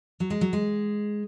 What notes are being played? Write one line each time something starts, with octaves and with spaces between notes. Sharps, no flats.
F#3
G#3
F#3
G#3